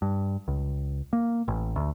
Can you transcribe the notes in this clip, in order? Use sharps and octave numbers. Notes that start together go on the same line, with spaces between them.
G2
C#2
A#3
A1
D2